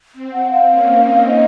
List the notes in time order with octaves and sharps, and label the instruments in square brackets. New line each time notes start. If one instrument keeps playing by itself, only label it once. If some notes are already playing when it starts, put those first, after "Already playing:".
[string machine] C4
[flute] F#5
F5
[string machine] A#3 C#4
C4 D#4
[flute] D#5